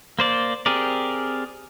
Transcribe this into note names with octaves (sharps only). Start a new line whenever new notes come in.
A#3 C5 D5
C4 G4 G#4 A#4 D5